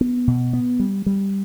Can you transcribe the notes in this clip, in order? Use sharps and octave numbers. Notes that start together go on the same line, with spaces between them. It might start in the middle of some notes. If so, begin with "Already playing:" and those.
B3
B2
B3
G3
G3